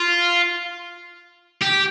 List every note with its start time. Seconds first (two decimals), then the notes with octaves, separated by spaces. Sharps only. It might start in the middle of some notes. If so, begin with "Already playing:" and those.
Already playing: F4
1.62 G4